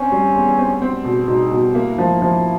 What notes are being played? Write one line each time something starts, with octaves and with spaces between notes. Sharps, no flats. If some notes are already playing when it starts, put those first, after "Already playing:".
Already playing: C4 C#4
G3
E2
C4
C4
B2
B2 D#4
B2
A#3 E4
F3
F3